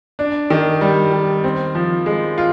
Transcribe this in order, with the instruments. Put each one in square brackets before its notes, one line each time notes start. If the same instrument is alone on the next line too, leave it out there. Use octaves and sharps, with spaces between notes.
[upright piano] D4
D#3
G3
D#3
C4
F3
G#3
F4